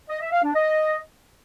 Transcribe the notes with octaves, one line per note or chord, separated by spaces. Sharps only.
D#5
E5
F5
D4
D#5